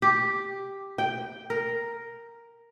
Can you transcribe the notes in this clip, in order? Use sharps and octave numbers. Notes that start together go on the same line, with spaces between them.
G4
G5
A#4